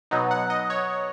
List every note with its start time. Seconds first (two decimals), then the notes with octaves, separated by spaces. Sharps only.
0.11 B2 F#3 B3 D#4
0.31 F#5
0.50 D#5
0.70 C#5